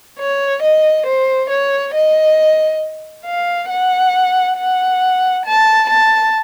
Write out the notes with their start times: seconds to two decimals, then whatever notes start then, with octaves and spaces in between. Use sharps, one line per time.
0.19 C#5
0.63 D#5
1.06 C5
1.50 C#5
1.95 D#5
3.26 F5
3.70 F#5
4.58 F#5
5.46 A5
5.89 A5